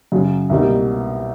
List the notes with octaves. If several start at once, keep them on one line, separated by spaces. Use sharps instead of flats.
F#2 C#3 F#3
C2 B2 G3 A#3 D#4